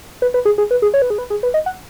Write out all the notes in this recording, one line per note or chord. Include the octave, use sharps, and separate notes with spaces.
B4
B4
G#4
G#4
B4
G#4
C#5
B4
G#4
B4
G#4
B4
D#5
F#5